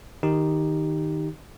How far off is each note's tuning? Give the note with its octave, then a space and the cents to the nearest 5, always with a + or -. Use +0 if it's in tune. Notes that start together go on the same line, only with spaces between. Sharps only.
D#3 +0 D#4 +0 G4 +0